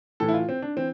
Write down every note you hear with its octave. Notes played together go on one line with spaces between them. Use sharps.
A2 E3 A4
E4
F4
C4
D4
E3 C4